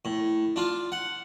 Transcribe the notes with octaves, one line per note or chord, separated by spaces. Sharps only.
A2
D4 F4
F#5